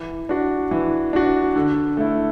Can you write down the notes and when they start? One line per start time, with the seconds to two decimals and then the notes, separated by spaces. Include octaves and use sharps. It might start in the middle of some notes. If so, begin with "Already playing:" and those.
Already playing: E3
0.29 D4 F#4
0.71 E3
1.13 D4 F#4
1.56 D3
1.97 A3 E4